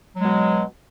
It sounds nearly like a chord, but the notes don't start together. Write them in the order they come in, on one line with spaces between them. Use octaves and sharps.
F#3 G#3 B2